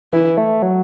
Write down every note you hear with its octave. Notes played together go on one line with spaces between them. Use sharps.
E3 E4
A3
F#3